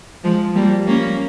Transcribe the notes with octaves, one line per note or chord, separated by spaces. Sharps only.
F3 G#3
G3 A#3
A#3 C#4